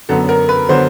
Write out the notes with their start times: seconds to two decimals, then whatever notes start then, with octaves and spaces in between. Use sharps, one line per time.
0.09 F#2 D3 F#3 B3 A4
0.29 A#4
0.49 B4
0.69 D3 F#3 B3 C5